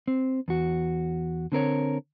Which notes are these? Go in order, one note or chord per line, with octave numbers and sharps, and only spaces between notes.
C4
E2 F#4
D3 C4 A#4 C#5